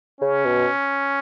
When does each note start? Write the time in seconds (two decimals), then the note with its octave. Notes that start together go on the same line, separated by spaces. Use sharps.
0.21 C#3 C#4
0.45 B2